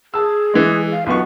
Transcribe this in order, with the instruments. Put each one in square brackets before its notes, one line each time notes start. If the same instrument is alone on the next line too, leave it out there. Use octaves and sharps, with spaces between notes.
[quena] G#4 [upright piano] A5 E6
[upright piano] E3 G#3
[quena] F5
[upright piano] B1 B3 C#6 [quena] F4